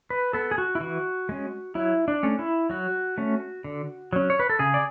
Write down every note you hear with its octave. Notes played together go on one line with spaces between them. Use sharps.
B4
B3 A4
G#4
F#4
E4
E3 F#4
G#3 C#4
F#3 E4
D4
A3 C#4
E4
F#3 F#4
A3 C#4
D3
F#3 C#4
C#5
B4
A4
C#3 G#4
D5